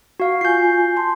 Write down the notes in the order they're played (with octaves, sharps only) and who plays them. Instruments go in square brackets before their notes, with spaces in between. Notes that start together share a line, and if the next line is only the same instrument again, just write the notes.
[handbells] F#4 F5
[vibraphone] F4 G#5 [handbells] G6 C7
[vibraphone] A5 C6